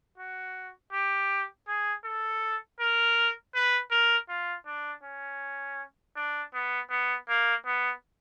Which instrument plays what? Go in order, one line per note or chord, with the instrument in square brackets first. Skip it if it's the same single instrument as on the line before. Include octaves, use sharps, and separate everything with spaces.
[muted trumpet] F#4
G4
G#4
A4
A#4
B4
A#4
F4
D4
C#4
D4
B3
B3
A#3
B3